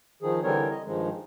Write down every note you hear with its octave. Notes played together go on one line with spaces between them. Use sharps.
D#3 F3 G#4
D3 E3 G3 C4 A#4 C#5
D#5
G2 D#3 F3 G#3